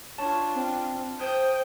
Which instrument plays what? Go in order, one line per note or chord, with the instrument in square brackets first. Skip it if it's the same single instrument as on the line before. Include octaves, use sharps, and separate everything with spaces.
[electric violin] D4 F4 [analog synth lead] C#5 [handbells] A5
[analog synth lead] C4
[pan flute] C5 [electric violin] G5 [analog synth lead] D#6